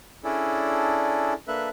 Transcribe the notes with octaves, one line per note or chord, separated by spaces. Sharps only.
C#4 D4 E4 G#4 A4 D5
A#3 D4 A4 B4 E5 F#6